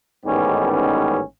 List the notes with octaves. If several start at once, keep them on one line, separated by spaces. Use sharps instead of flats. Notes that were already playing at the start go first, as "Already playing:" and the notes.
A1 G#2 D#3 G3 B3 C#4
C#4